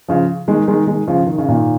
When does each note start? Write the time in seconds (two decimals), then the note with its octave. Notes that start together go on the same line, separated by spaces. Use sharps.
0.08 C#3 F3
0.48 D#3 G#3
0.68 D#3 G#3
0.87 D#3 G#3
1.08 C#3 F3
1.27 D#3
1.38 C#3
1.49 A#2 D#3